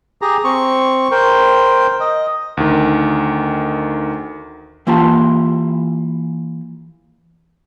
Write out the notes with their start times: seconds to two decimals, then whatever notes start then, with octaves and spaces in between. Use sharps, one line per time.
0.22 G4 G#4 A#5
0.44 C4 C#6
1.11 A#4 C5 G5
2.00 D#5
2.57 D2 D#3
4.87 E3 A#3 F4 G4 A5